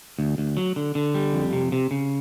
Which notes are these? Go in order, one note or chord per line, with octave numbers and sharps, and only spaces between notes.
D2
D2
F#3
D3
D3
G3
F2
C3
C3
C#3